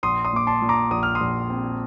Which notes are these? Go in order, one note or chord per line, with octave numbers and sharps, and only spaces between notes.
A#1 C6 D#6
C6 D#6
A#2 D6
A5 C6
A#2
A#5 D6
A#1 D#6
F6
C6 D#6
A#1
C4